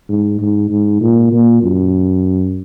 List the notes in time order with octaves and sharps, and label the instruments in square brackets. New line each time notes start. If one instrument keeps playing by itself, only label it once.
[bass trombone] G#2
G#2
G#2
A#2
A#2
F#2